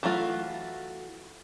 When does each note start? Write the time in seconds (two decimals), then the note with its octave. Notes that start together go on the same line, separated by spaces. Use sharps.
0.03 E3 F#3 A3 F4